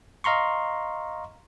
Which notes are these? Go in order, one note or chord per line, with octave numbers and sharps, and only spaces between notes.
D#5 F5 A#5 C6 C#6